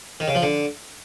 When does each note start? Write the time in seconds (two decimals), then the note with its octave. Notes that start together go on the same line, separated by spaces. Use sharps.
0.20 D#3
0.28 C#3
0.35 F3
0.42 D3